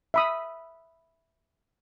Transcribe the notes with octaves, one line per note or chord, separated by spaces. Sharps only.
E5 B5 D#6